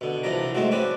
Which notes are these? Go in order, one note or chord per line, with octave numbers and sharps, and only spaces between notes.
B2 D3
C2 E3 F3 D4 A#5
G#2 G#3 A3 C4 F#4
C4 C#4 B4 D5